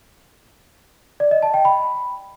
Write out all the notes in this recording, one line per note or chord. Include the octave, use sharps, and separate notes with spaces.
D5
D#5
A5
G5
B5